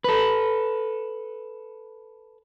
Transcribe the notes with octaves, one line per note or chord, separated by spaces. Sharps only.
A4 B4